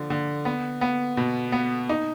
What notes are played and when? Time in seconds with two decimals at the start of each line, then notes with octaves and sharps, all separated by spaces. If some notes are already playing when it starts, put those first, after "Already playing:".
Already playing: D3 F3
0.10 D3
0.45 B3
0.81 B3
1.17 B2
1.52 B3
1.89 D#4